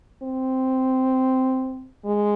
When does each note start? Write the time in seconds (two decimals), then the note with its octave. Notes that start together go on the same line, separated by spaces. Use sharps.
0.23 C4
2.05 G#3